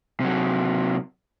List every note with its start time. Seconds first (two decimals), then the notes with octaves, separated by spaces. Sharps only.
0.20 C3 F#3